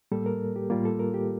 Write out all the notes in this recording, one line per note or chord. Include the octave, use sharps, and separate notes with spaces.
A2 G3 A#3 A4
A#4
G4
A2 G3 A#3 F4
A4
A#4
G4